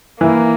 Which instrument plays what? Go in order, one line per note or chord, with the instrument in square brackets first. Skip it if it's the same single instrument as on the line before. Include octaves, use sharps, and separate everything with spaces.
[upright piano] E3 [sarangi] A#3